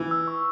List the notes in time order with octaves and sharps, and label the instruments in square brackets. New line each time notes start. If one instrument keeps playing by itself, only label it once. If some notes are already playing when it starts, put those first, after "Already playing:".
Already playing: [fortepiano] E3
[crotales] E6
C#6